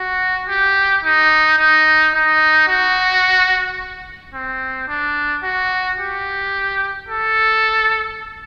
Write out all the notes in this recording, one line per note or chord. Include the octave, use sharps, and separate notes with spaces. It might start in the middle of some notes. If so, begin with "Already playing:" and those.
Already playing: F#4
G4
D#4
D#4
D#4
F#4
C4
D4
F#4
G4
A4